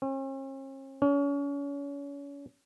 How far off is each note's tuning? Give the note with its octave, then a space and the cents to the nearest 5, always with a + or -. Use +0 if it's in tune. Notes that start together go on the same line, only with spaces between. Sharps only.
C#4 -45
C#4 +35